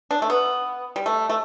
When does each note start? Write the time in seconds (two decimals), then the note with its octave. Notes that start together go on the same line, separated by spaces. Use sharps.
0.11 D4
0.22 A3
0.30 B3
0.96 G3
1.06 A3
1.29 A3